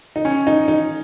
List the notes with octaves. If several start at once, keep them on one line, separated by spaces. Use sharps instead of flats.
D#4
C#4
D#4
D#4